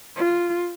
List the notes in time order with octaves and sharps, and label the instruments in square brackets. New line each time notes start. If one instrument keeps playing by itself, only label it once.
[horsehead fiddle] F4